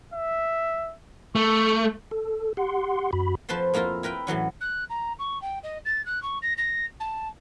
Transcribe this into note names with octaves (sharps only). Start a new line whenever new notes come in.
E5
A3 C#6
A4
G4 F#5 C6
F#2 F#4 B5
F2 F3 B4 C5 A5 C6
F2 A#3 E4 F4 A#4
E4 A#4 B4 G5
A2 E3 F#3 C#4
F#6
A#5
C#6
G5
D#5
A6
F#6
C#6
A#6
A#6
A5